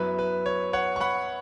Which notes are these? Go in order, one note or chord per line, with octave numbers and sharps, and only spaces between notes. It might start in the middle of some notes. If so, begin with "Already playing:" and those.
Already playing: F#2 F#3 B3 E4 B4 E5
B4
C#5
C#5 F#5
C#6
F#5 B5